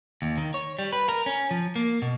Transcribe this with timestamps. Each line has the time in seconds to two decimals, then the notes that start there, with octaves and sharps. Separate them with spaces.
0.22 D#2
0.37 D#3
0.54 C#5
0.79 G3
0.93 B4
1.09 A#4
1.26 C#4
1.51 F3
1.76 A#3
2.02 B2